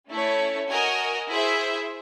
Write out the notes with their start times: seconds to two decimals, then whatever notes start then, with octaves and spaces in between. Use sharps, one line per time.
0.10 A3 C#4 E4 A4 C#5
0.69 F#4 A#4 D#5 G#5
1.28 E4 G#4 C5 E5